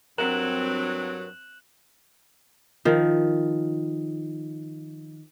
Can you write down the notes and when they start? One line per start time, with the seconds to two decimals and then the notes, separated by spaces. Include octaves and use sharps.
0.18 G2 F#3 C4 A#4 F#6 E7 F#7
2.85 D#3 F3